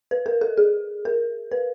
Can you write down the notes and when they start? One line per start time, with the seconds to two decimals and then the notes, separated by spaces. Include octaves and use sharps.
0.11 B4
0.26 A#4
0.41 A4
0.58 G#4
1.05 A#4
1.52 B4